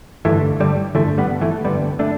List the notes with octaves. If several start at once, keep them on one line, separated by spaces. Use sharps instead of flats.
G2 D3 E3 A3
D3 G3
G2 D3 E3 A3
G3 B3
E3 A3
G2 D3 G3 B3
A3 D4